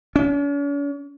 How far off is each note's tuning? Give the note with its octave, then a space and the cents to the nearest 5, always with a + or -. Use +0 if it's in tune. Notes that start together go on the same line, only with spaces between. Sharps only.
C#4 +45